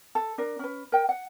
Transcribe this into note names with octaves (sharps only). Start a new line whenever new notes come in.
A4
D4 A#4
C#4 B4
A#4 G5
F#5